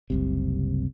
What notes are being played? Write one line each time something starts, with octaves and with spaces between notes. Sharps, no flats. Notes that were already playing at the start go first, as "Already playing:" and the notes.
F#1 C2 C3